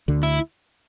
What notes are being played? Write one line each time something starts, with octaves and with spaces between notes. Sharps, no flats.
D2 D3
E4